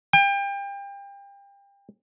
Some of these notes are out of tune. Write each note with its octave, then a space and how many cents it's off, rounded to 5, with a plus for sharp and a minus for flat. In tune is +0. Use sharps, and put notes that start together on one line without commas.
G5 +30